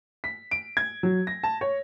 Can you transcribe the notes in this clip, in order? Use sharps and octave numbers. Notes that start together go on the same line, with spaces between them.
B6
D7
G#6
F#3
A#6
A5
C#5